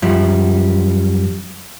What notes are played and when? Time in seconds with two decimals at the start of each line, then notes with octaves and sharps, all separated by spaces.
0.02 F#2 F3 G3